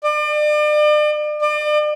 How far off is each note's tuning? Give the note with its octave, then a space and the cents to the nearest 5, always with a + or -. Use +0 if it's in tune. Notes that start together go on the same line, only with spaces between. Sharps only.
D5 +40
D5 +40